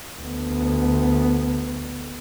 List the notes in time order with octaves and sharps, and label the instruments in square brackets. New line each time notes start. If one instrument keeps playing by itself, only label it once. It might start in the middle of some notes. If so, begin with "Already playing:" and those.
[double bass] D2 B3